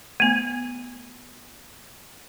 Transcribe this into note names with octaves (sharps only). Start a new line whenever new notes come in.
A3 B3